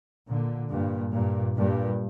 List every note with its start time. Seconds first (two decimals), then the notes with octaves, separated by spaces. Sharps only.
0.28 A#2 D3
0.71 G2 A#2
1.13 G2 A#2
1.56 G2 A#2